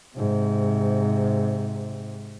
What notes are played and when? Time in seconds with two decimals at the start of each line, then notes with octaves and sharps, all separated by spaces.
0.16 G#2 C3